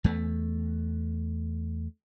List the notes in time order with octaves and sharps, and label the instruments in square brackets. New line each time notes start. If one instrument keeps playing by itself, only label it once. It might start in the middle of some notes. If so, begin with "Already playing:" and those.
[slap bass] E2 A3